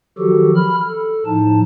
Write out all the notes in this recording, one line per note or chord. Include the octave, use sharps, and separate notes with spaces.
D#3 F3 F#3 F#4 G4 A4
B5 F6
A4
A2 F3 D#4 A5